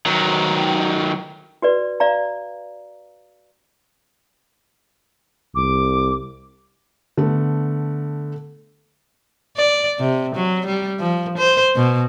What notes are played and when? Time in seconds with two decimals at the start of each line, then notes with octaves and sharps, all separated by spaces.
0.06 D#3 F#3
1.62 F#4 B4 D5
2.00 D5 F5 A#5
5.55 C2 D6
7.17 D3 A3 B3
9.57 D5
9.99 C3
10.35 F#3
10.66 G3
11.00 F3
11.38 C5
11.76 B2